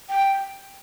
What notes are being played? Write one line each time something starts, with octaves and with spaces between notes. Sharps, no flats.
G5